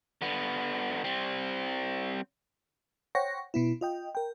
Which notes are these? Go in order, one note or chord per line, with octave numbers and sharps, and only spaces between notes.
D3 B3
G3 C4
C5 C#5 F#5 G5 C#6 A#6
B2 B3 E4
F4 D#5 G5
A#4 G5